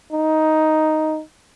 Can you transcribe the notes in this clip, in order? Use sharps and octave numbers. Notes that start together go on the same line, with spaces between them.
D#4